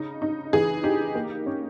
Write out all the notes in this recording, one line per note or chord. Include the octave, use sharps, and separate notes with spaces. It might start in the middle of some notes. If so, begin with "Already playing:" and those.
Already playing: C#3 D#4
D#4
E3 G#4
D#4 G4
A#3
C#4